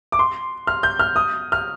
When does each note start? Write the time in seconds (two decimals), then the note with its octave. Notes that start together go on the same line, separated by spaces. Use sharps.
0.12 D6
0.19 C6
0.67 F6
0.83 G6
0.99 F6
1.16 D#6
1.52 F6